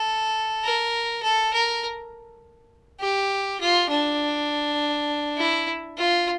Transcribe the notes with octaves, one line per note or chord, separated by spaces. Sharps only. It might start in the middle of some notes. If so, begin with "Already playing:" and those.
Already playing: A4
A#4
A4
A#4
G4
F4
D4
E4
F4